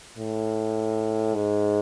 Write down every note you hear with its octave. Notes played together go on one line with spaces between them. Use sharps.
A2
G#2